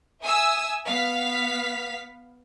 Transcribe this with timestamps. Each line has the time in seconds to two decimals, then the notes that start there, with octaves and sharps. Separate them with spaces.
0.22 E5 G#5 D#6 E6
0.87 B3 F5 B6